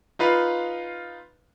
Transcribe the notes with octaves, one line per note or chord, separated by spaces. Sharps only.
D#4 F4 B4 F5